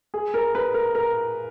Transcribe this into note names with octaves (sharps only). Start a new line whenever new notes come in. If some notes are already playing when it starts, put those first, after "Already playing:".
G#4
A#4
B4
A#4
A#4